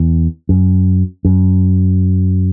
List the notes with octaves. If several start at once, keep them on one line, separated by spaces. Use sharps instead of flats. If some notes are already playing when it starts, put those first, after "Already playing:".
Already playing: E2
F#2
F#2